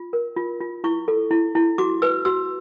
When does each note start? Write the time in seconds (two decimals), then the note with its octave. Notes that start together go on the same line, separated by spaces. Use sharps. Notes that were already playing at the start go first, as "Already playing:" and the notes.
Already playing: F4
0.13 A#4
0.36 F4
0.60 F4
0.84 E4 C#6
1.08 A4
1.31 E4
1.55 E4
1.78 F#4 D6
2.02 B4 E6
2.25 F#4 E6